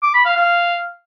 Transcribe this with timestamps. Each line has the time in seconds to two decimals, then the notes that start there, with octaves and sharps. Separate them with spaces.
0.03 D6
0.14 B5
0.25 F5
0.36 F5